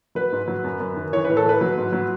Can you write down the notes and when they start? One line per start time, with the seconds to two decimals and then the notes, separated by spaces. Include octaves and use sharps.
0.15 F#3 B4
0.33 G#2
0.48 F#3
0.64 F#2
0.80 F#2
0.96 D#3
1.13 E3 C#5
1.25 A2 B4
1.37 A4
1.45 E3 B4
1.61 F#3
1.78 G#2
1.93 F#3